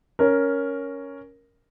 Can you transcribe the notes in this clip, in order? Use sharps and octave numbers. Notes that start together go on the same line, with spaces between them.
C#4 A#4